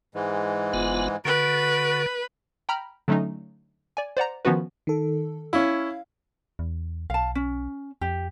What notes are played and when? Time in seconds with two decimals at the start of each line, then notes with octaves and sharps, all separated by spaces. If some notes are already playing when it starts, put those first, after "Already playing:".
0.15 G#2 E3 G#3
0.74 F#1 B3 F4
1.25 D3 F#4 B4
2.69 G5 A#5 B5 F6
3.08 D3 F#3 A3 C#4 D#4
3.97 D5 G#5
4.17 C5 D5 F#5 A#5
4.45 D#3 F3 B3 C#4 F#4 B4
4.87 D#3 A4
5.53 C#4 E4 F5
6.59 E2
7.10 B1 F5 A5
7.35 C#4
8.01 F2 G4